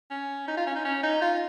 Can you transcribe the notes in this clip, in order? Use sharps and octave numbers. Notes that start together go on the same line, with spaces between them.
C#4
D#4
F4
C#4
D#4
C#4
D#4
F4